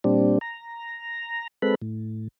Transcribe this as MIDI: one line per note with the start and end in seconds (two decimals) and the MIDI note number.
0.04 0.38 46
0.04 0.38 55
0.04 0.38 60
0.04 0.38 62
0.41 1.47 82
1.62 1.75 56
1.62 1.75 60
1.62 1.75 69
1.62 1.75 71
1.62 1.75 83
1.82 2.28 45